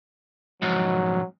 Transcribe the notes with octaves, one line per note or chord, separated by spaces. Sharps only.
F2 G#2 F#3